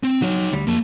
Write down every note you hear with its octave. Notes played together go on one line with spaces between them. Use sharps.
C4
F#3 D#4 C#5
D2 G3
F2 A#3 A5